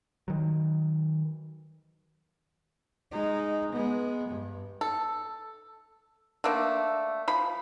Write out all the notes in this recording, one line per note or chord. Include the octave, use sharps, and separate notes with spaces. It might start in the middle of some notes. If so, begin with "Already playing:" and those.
D#3 F#3
G#3 D#4
G#3 B3
G2
A4
D3 A3 A#3 D4
F3 B5